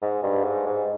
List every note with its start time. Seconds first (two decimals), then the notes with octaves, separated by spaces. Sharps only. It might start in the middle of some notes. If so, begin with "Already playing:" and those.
0.02 G#2
0.23 G2
0.44 G#2
0.66 G#2